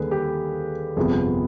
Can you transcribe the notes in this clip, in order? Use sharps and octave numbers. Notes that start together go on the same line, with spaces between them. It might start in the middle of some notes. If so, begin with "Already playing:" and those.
Already playing: D#2 D3 G3 G#4 B4
G4
G1 F2 C3 F3 B3 G#4